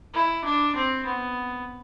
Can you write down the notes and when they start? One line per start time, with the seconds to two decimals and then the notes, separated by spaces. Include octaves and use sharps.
0.14 E4
0.44 D4
0.75 C4
1.05 B3